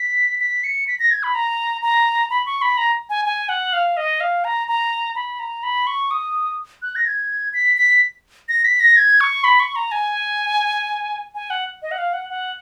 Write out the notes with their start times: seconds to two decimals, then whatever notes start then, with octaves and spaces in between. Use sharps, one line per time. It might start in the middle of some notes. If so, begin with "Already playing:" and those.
Already playing: B6
0.40 B6
0.64 C#7
0.88 B6
0.99 A#6
1.11 G#6
1.23 B5
1.35 A#5
1.83 A#5
2.30 B5
2.46 C#6
2.62 B5
2.78 A#5
3.10 G#5
3.25 G#5
3.49 F#5
3.73 F5
3.97 D#5
4.20 F5
4.44 A#5
4.68 A#5
5.16 B5
5.39 A#5
5.63 B5
5.87 C#6
6.11 D#6
6.82 F#6
6.96 A#6
7.06 G#6
7.54 B6
7.77 B6
8.49 A#6
8.65 B6
8.80 A#6
8.97 G#6
9.21 C#6
9.44 B5
9.60 C#6
9.75 A#5
9.92 G#5
11.35 G#5
11.50 F#5
11.82 D#5
11.91 F#5
11.98 F5
12.13 F#5
12.29 F#5